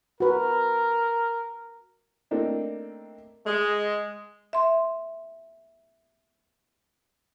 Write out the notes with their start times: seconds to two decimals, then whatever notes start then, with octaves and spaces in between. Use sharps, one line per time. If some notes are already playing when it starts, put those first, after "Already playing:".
0.20 F#4 A#4 B4
2.31 A3 A#3 C4 D4 D#4
3.46 G#3
4.53 E5 C6